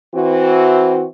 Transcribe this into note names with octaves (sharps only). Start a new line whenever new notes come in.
E3 C4 F#4